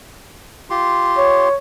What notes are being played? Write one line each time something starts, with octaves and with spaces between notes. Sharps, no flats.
F4 G4 C6
C#5